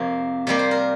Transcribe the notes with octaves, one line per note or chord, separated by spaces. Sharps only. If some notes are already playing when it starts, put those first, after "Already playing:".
Already playing: F2 C3 A#3
C3 G3 A#3 D5
C5
A#4